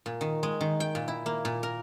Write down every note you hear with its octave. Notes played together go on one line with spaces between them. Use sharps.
A#2
D#3
G#3
D#3
G5
A#2
E4
A#3
A#2
A#4